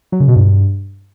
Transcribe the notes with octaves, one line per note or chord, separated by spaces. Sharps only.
F#3
C#3
B2
G2